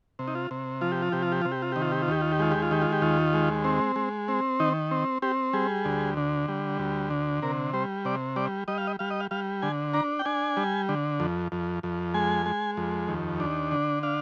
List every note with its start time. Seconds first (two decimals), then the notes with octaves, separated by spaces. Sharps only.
0.19 C3
0.28 D#4
0.35 F4
0.51 C3
0.81 F3 F4
0.92 G4
1.02 F4
1.12 C3 G4
1.22 F4
1.32 G4
1.42 C3 F4
1.52 G4
1.62 F4
1.72 D#3 G4
1.82 F4
1.92 G4
2.02 F4
2.08 D#2 G4
2.21 F4
2.32 G4
2.39 G#3 F4
2.52 G4
2.62 F4
2.71 D#3 G4
2.82 F4
2.92 G4
3.02 D#2 F4
3.34 G#3
3.64 C4
3.96 G#3
4.28 C4
4.60 D#3 D#4
4.91 C4
5.22 C4 G4
5.53 G3 G#4
5.85 D2
6.17 D3
6.48 G3
6.79 D2
7.10 D3
7.42 C3 A#4
7.73 G3 C5
8.05 C3 D5
8.36 G3 D5
8.68 G3 D#5
8.78 F5
8.87 D#5
8.99 G3 F5
9.10 D#5
9.20 F5
9.31 G3 F5
9.62 D3 G#5
9.94 D4 A#5
10.19 G5
10.25 D4 G#5
10.57 G3
10.89 D3
11.20 F2
11.52 F2
11.83 F2
12.14 G#3 G#5
12.46 G#3
12.77 F2
13.08 D#2
13.40 D4
13.71 D3
14.03 D4 F5